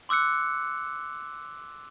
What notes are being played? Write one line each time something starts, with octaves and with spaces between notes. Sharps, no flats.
C6 D6 E6 F#6 C#7